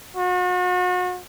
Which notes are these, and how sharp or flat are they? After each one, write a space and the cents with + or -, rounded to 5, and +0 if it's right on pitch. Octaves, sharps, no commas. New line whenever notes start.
F#4 -40